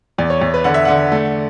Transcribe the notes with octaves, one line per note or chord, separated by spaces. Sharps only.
E2 D5
C#5
E2
B4
D3 F#5
E5
D3 F#5
A3